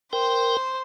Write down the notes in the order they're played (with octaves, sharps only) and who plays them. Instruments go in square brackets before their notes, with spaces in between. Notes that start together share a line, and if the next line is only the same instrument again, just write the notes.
[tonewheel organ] A#4 G5 [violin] C5